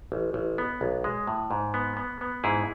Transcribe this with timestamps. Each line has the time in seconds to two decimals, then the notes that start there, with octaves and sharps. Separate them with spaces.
0.12 A1
0.34 A1
0.58 B3
0.81 B1
1.04 G#3
1.27 A2
1.51 G#2
1.74 B3
1.97 B3
2.21 B3
2.44 G#2 E4 G#4